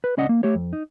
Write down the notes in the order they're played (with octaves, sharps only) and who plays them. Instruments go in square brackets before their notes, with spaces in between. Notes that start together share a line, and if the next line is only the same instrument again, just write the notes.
[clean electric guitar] B4
C#2 C#4 D5 D#5 F#5
A#3
A3 G4 C#5
F2
D#4